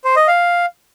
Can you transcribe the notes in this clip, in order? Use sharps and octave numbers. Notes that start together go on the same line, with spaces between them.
C5
D#5
F5